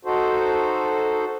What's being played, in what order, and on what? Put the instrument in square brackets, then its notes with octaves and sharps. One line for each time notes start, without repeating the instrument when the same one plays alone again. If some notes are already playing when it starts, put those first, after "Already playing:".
[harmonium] D#4 F#4 A4 C5